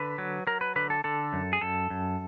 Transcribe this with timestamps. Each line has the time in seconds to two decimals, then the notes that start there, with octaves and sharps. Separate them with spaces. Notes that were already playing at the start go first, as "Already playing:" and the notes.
Already playing: D3 B4
0.18 F#3
0.47 F#3 A#4
0.61 B4
0.76 D3 B4
0.90 A4
1.04 D3 A4
1.33 F#2
1.53 G#4
1.61 F#2 A4
1.90 F#2